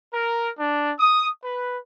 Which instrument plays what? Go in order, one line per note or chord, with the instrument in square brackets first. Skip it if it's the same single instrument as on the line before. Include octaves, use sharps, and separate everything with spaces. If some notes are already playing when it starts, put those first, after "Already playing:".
[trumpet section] A#4
D4
D#6
B4